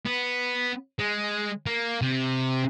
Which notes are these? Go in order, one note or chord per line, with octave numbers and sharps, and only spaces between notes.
B3
G#3
A#3
C3